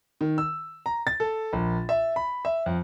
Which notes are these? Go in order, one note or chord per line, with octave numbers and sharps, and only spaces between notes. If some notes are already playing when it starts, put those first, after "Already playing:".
D#3
E6
A#5
A6
A4
A#1
E5
B5
E5
F2